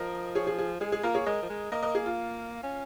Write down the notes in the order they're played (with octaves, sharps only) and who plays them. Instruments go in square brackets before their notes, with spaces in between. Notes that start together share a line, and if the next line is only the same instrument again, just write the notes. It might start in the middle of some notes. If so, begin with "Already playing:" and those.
Already playing: [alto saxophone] F3 [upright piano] A#4 D#5
[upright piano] G#4 C#5
G#4
G#4
[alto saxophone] G#3 [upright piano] G#4
[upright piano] G#4
[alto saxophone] A#3 [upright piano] F4 A#4
[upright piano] G#4 C#5
[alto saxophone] G#3 [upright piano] A#4 D#5
[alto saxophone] F3
G#3
[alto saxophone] A#3 [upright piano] A#4 D#5
[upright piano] A#4 D#5
G#4
F4
[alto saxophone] C#4